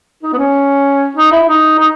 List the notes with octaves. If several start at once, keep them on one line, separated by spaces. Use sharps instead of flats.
D#4
B3
C#4
D#4
E4
E4
D#4
D#4